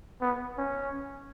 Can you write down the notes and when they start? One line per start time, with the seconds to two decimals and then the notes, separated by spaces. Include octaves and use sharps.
0.21 B3
0.58 C#4